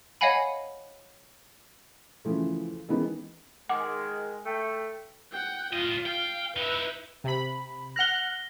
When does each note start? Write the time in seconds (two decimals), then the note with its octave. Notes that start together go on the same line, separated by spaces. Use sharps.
0.21 C#5 D#5 F5 F#5 G#5 B5
2.25 C#3 E3 F3 A3
2.89 D#3 E3 G#3 B3 C#4 D#4
3.69 D#3 G#3 F#5 D6
4.46 A3 G5
5.32 F#5 G5
5.73 A2 F4 D#5
6.06 F5 G5
6.57 D#4 E4 B4 E5
7.24 C3 B5
7.96 F#5 F6 F#6 A#6 G7